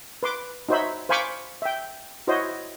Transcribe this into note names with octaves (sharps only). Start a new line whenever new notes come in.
B4 C6 D6
D#4 F#4 C5 C#5 E5 B5
C5 F5 G#5 B5 C#6 D6
E5 G5
E4 F#4 C5 C#5 D#5